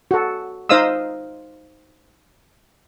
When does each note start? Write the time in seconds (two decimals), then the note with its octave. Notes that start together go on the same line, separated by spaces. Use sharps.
0.11 F#4 A4
0.69 D#4 C5 D#5 F5 D#6 E6